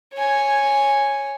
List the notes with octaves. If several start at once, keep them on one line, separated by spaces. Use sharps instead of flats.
C#5 G#5